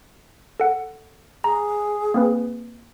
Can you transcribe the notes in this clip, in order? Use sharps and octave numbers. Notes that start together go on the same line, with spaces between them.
A4 F#5
G#4 A#5
A#3 C4 B4